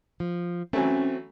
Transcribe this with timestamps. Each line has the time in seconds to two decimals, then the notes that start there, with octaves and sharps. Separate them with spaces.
0.20 F3
0.73 E3 F#3 A3 C4 C#4